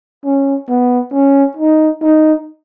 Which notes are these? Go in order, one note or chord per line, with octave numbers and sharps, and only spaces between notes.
C#4
B3
C#4
D#4
D#4